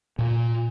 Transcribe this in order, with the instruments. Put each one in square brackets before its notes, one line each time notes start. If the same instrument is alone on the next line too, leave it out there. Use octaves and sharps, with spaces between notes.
[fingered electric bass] A#2